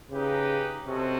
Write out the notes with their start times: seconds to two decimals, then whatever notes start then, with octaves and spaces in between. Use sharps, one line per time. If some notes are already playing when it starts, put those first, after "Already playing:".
0.11 C#3 D#4 G4 B4
0.87 C3 C#4 F#4 A4 C5 D#5